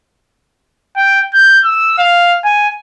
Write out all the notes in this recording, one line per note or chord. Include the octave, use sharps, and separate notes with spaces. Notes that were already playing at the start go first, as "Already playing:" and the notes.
G5
G6
E6
F5
G#5